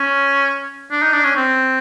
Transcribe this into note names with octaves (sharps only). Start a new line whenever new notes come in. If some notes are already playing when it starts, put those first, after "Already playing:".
Already playing: C#4
D4
D#4
D4
C#4
C4